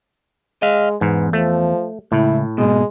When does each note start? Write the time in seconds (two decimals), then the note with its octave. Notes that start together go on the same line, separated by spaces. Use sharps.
0.62 G#3 D#5 F5
1.01 E2 G#2 B3
1.33 F3 A3
2.12 C#2 A2 E4
2.58 G#2 B2 G#3